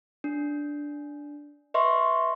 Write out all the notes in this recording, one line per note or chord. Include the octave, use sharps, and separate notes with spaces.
D4
B4 D#5 E5 C6 C#6